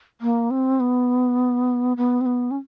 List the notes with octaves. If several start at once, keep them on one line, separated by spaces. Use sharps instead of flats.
A#3
C4
B3
B3
C4
B3
C#4